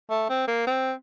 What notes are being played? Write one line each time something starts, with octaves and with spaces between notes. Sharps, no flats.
A3
C4
A#3
C4